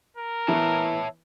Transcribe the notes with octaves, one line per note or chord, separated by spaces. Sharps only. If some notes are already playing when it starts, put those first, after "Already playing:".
A#4
E3 B3 C#5 E5 A5